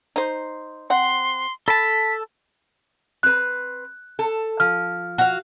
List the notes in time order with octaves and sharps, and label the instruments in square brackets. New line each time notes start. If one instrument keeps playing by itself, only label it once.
[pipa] D#4 C5
[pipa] C4 F#5 [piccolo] C6
[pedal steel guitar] A4 A5 [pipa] B5 [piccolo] B6
[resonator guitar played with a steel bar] C4 B4 [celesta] F#6
[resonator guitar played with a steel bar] A4
[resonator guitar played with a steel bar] F3 [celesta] F6
[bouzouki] F#4 F5